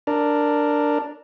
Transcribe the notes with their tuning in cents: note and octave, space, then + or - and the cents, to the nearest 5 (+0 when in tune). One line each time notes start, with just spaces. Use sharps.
D4 +0 A#4 -5